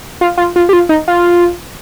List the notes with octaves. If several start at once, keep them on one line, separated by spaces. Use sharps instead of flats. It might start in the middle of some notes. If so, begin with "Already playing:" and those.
F4
F4
F4
G4
F4
D#4
F4